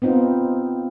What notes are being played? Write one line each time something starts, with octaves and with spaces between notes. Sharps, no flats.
B3 C4 D#4 F4